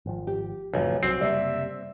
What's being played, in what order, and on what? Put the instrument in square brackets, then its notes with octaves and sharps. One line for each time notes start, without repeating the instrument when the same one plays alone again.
[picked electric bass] G#1 F3
[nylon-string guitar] G4
[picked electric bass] F#1 F2 A2 [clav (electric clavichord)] B1 [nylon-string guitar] E3 F3
[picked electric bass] C2 F#3 [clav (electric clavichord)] C4 [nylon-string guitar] F#4
[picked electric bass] F#1 C3 A#3 [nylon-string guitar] G3 D5 [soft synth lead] E5